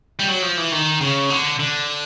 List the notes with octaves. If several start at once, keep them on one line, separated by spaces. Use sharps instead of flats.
G3
F#3
F3
E3
D#3
C#3
D3
D3